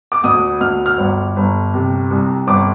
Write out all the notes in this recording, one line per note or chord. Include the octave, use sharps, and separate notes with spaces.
D6
D2 D#6
D2 F6
F6
G1
G1
C3
C2
G1 D6